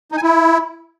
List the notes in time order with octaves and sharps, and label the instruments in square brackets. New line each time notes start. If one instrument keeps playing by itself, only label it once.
[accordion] D#4
G#5
E4